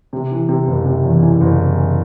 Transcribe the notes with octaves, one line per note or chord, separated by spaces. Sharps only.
C3
E3
C3
F#1
C3
E2
E3
F#1